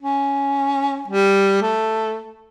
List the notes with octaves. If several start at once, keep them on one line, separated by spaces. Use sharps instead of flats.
C#4
G3
A3